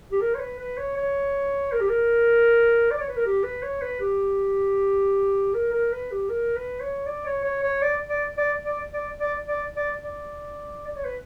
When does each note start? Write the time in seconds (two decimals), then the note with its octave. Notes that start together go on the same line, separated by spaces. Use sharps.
0.12 G4
0.20 A#4
0.34 C#5
0.40 B4
0.59 B4
0.77 C#5
0.97 C#5
1.72 A#4
1.80 G4
1.89 A#4
2.91 D5
3.00 C#5
3.08 B4
3.16 A#4
3.25 G4
3.43 B4
3.63 C#5
3.82 B4
4.00 G4
5.54 A#4
5.72 A#4
5.92 B4
6.11 G4
6.29 A#4
6.56 B4
6.80 C#5
7.06 D5
7.26 C#5
7.44 C#5
7.63 C#5
7.82 D5
8.09 D5
8.38 D5
8.65 D5
8.94 D5
9.20 D5
9.48 D5
9.76 D5
10.03 D5
10.87 D5
10.96 C#5
11.05 B4